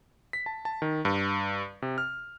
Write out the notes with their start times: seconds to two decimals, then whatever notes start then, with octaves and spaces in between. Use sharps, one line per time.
0.33 B6
0.46 A5
0.65 A5
0.82 D#3
1.05 G2
1.82 C3
1.98 F6